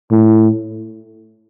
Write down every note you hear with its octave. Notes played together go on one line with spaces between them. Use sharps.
A2